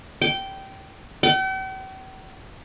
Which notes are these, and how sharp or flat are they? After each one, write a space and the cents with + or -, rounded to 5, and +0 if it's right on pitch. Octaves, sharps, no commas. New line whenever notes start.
G5 -15
G5 -45